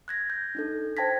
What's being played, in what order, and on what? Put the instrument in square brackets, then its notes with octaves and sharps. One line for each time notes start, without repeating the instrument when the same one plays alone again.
[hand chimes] F#6 G#6 A#6
G6
D4 D#4 A4
C5 G5 A5 G#6 A#6 B6